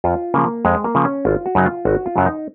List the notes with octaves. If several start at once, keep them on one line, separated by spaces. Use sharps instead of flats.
F2 F4
C#3 F3 A#3
F2 G#3
A#3
C#3 F3
C#4
G#1 F4
F#4
F#2 C#3 F#3 D#4
F4
G#1 F#4
F4
F#2 C#3 F#3
D#4